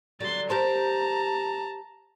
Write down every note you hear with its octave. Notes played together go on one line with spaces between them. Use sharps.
D3 F#3 G3 C6 A6
G4 A#4 C5 A5 A#5